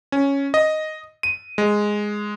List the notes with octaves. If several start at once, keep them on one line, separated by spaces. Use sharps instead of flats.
C#4
D#5
D#7
G#3